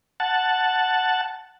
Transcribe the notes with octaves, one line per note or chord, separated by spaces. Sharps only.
F#5 A5